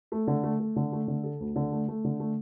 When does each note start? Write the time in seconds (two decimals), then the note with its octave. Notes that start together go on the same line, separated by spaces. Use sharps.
0.12 A3
0.27 D3
0.44 A3
0.60 A3
0.76 D3
0.93 A3
1.08 D3
1.23 A4
1.40 D2
1.56 D3
1.72 A3
1.88 A3
2.04 D3
2.20 A3